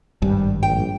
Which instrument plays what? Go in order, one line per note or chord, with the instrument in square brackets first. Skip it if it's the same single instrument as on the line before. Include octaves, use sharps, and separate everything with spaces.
[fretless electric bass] G#1 G2 [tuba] G3
[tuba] A#1 [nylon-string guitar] G5